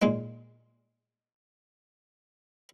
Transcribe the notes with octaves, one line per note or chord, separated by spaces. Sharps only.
A#2 G#3 A#3 D#4